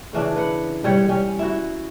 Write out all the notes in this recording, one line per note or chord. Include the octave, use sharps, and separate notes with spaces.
C#3 E3 D4
B4 F#5
G3 C#5 F#5
G3 C#4
E4 F#4